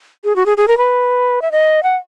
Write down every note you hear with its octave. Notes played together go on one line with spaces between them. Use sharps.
G#4
F#4
G#4
G#4
A#4
B4
E5
D#5
F#5